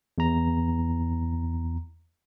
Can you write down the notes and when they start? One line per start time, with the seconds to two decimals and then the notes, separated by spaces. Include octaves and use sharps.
0.18 E2 A#5